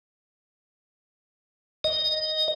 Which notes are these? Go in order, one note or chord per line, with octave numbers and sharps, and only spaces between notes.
D#5